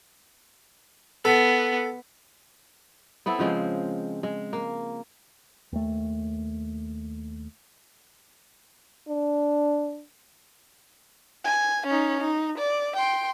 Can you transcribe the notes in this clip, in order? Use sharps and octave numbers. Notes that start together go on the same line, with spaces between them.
B3 A4
B3 C4 E4 A4
C#3 F3 G#3 C4
G#3
A#3
D#2 A3
D4
G#5
C#4 D#4
D#4
D5
G5 C6